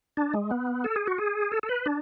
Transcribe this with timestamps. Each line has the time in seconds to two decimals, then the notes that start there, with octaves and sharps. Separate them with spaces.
0.17 D4
0.34 G#3
0.51 B3
0.84 A4
0.96 G#4
1.07 F#4
1.18 G#4
1.52 A4
1.63 A4
1.69 B4
1.86 D4